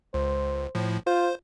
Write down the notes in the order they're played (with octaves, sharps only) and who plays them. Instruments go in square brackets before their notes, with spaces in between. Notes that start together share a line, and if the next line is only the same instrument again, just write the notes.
[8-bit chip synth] C#2 [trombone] C5
[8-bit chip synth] A2 F3
[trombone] F4 [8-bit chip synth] C5